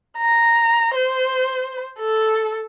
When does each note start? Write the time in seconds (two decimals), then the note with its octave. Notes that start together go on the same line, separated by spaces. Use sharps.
0.18 A#5
0.95 C5
1.99 A4